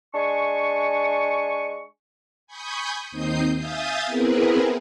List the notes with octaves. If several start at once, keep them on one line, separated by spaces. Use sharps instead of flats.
G#3 D4 G#5 C#6
G#5 B5 C#6 D#6 G6
D#2 C4 D#4 D#6 G6 C7
E5 F5 G#5 D#6 G6 A6
B3 C4 E4 G#4 A#4 B4